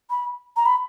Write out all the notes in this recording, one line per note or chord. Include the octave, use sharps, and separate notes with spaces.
B5
A#5
B5